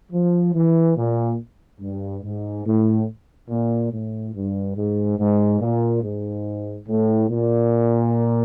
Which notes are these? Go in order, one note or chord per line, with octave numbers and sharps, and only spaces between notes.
F3
E3
A#2
G2
G#2
A2
A#2
A2
G2
G#2
G#2
A#2
G#2
A2
A#2